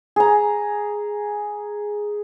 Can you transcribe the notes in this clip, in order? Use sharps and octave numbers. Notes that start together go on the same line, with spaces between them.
G#4 A#5